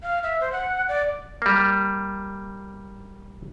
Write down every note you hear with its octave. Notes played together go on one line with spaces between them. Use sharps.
F5
E5
C5
F#5
D5
G3 A#3